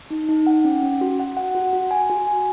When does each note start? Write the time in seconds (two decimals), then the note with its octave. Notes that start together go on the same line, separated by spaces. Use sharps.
0.11 D#4
0.29 D#4
0.47 F#5
0.65 C#4
0.83 C#4
1.01 F#4
1.19 F#5
1.37 F#5
1.55 F#4
1.73 F#4
1.91 G#5
2.09 F#4
2.27 G#5